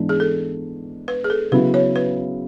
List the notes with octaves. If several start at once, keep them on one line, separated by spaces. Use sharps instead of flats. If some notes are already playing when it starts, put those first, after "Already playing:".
Already playing: G#2 E3 B3 D4
G#4
A4
B4
G#4
A4
C#3 F#3 B3 E4 B4
C#5
B4